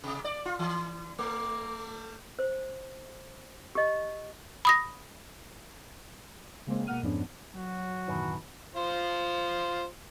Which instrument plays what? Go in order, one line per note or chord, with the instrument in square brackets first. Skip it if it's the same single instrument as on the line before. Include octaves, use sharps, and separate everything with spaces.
[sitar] C3
D5
F4
E3
A3
[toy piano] C5
G4 D#5
[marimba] B5 D#6 A#6
[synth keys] C#3 G#3 A#3 C4
B2 G#3 A#3 F#5 F6 D#7
F2 G#2 F3 B3 C#4 D4
[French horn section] F#3 [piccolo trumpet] F#4
[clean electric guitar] B1 E3 [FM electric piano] F#2 A2 D#3
[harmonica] F4 C5